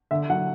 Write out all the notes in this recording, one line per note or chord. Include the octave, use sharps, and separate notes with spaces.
D3 E5
F#3 F#5